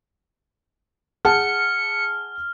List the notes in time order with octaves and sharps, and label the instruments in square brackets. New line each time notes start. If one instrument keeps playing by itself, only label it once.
[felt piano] G#4 F#5 A5 [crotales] F6 [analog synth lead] C#7